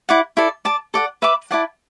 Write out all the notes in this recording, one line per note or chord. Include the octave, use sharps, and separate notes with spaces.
E4 D5 F#5
E4 A4 D5
D5 A5 D6
A4 D5 F#5
B4 E5 B5 D6
E4 D5 F#5 A5